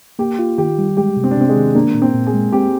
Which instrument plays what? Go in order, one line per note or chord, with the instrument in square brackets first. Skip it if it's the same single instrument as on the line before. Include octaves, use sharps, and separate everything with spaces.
[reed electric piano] A#3 [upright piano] G4
[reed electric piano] F4
[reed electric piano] D#3 [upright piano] G4
[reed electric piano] G3
[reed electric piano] G#3 [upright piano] G4
[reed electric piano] C3
[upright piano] C4
D4
[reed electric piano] C3 [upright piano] C4
[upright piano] G#3
[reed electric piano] D#3
[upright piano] A#3 [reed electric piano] D4
[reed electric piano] A#2
[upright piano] C4
[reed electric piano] A#2
[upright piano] G#4
[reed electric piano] G#3
[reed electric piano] C4 [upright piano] G4